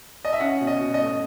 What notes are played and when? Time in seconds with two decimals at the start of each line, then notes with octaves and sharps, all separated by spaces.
0.25 D#5
0.33 E5
0.40 C#4 F#5
0.61 B2
0.67 D#5
0.81 B2
0.94 D#5
1.01 A3